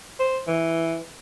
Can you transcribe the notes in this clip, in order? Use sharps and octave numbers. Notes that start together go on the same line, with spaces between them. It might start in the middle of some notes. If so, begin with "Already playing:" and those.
C5
E3